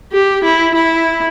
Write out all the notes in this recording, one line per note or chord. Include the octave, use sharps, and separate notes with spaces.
G4
E4
E4